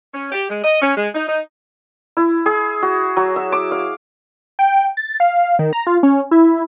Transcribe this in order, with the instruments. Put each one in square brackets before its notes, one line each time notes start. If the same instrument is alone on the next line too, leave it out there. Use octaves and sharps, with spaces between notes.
[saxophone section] C#4
G4
G#3
D#5
C#4
G#3
D#4
D#4
[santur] E4
G#4
F#4
F#3
E5
D6
F5
[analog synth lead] G5
A6
F5
D#3
A#5
F4
C#4
E4